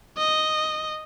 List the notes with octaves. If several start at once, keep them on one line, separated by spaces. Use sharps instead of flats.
D#5